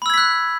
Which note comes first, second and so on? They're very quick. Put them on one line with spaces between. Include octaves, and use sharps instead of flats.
B5 E6 G#6 B6 F#6